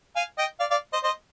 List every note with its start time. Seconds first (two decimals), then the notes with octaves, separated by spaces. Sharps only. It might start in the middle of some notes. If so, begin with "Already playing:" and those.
0.16 F5 G#5
0.38 D#5 G5
0.60 D5 F5
0.71 D5 F5
0.93 C5 D#5
1.03 C5 D#5